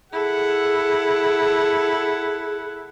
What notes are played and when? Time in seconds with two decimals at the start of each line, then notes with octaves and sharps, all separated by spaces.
0.12 E4 G#4 A4 F#5